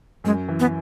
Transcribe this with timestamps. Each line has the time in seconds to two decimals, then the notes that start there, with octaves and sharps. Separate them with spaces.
0.24 F#2 G#3
0.48 E3
0.60 B3